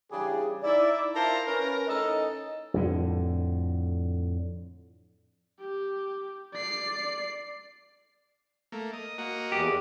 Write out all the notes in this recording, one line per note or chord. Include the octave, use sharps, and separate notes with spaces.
C#3 E3 G3 D4 G4 G#4
D#4 E4 D5
E4 F4 A#4 C5 A5
C#4 A#4 B4
A2 C#4 D#4 A4 D#5
F2 A2 D3
G4
D5 C7
A3 A#3
D#5
A#3 F#4 D#5
E2 G4